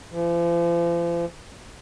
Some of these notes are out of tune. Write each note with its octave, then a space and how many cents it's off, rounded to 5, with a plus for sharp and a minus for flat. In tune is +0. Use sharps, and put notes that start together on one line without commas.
F3 -40